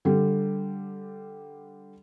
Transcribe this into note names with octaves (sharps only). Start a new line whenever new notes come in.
D3 G3